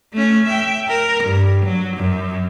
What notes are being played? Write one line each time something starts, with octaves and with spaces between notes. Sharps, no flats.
A3 C#4
E5 G5
A#4
G2
F#3
F#2